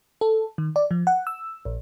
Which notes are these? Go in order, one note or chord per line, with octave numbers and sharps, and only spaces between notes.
A4
D#3
D5
F3
F#5
E6
A#1